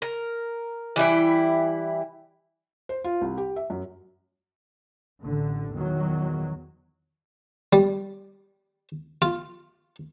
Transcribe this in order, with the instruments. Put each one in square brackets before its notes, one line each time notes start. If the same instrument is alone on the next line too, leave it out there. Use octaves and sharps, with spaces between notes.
[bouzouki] A#4
E3 G3 E4 G5
[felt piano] C5
F4
C2
G4
E5
F#2
[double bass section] A1 D3
E2 A#2 D#3 F#3
[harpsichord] G3
F4